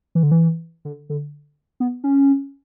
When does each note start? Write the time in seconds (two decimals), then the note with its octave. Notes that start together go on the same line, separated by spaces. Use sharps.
0.15 E3
0.23 D3
0.31 E3
0.85 D3
1.10 D3
1.80 B3
2.04 C#4